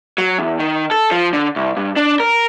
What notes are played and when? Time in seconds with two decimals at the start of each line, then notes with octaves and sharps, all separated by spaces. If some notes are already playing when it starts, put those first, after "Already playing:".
0.18 F#3
0.39 E2
0.59 D#3
0.91 A4
1.11 F3
1.33 D3
1.56 C2
1.77 G2
1.96 D4
2.20 A#4